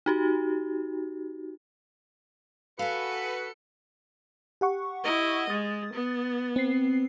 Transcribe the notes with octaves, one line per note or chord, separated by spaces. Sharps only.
D#4 F#4 G4
F#4 A4 B4 F5 G#5 C#7
G4 F#5 C#6
E4 D#5
G#3 D#6 A6
B3
C4 C7